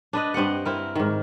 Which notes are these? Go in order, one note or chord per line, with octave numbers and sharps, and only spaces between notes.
D4 B4 D#5
G2 C4 D#5 F#5
C4 E4 A#4
G#2 D#3